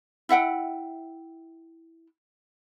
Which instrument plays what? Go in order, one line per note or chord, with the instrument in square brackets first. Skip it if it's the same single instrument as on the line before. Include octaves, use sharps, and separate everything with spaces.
[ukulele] E4 E5 F#5 G5